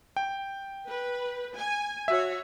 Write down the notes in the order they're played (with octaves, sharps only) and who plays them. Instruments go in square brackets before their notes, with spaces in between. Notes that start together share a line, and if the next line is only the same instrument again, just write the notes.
[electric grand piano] G5
[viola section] B4
G#5
[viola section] F#4 C#5 [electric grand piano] E5